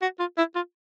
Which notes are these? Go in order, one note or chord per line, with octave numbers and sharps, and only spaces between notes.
F#4
F4
E4
F4